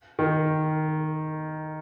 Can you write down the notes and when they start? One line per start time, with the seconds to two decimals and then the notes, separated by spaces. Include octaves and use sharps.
0.19 D#3